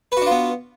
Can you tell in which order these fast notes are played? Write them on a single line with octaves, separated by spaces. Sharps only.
B4 F#4 D4 F4 B3